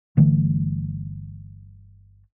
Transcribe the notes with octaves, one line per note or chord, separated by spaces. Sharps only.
G1 D3 E3 A3